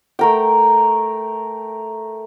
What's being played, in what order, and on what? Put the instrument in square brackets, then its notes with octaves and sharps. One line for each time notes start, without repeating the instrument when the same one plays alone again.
[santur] A3 A#4 G5